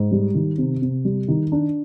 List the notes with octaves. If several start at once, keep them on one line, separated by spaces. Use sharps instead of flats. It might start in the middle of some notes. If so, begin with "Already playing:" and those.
Already playing: G#2
G3
D#3
C3
C3
G3
D#3
D4